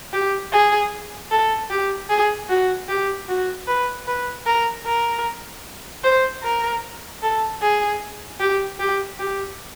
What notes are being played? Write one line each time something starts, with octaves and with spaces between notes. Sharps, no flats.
G4
G#4
A4
G4
G#4
F#4
G4
F#4
B4
B4
A#4
A#4
C5
A#4
A4
G#4
G4
G4
G4